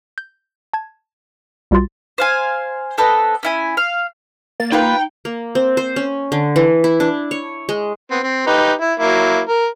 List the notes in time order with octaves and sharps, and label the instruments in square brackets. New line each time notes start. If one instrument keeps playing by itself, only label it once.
[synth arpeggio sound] G6
A5 G#6
B1 G3 F4 F#4 C6 A6
[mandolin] C5 F5 G#5
C4 A4 B4 D#5
C#4 E4 G#5
F5
[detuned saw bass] A#3 [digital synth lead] A6
[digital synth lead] D#4 [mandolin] F4 B4 B5 [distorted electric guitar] G5
[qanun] A#3
C4
C5
C#4
D3
E3
E4
D4
C#5
G#3
[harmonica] B3 C4
C4
D#4 G4 B4
E4
F#3 A#3 E4
A#4